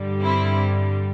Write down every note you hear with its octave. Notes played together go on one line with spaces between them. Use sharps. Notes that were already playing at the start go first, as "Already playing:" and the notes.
Already playing: G2 D3 G3
C4 E4